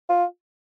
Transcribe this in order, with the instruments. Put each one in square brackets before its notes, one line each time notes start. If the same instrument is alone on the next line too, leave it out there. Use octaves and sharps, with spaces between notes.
[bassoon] F4